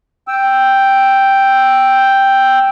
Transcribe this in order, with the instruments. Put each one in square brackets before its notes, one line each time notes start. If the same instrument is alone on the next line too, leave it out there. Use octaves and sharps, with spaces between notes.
[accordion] G5 E6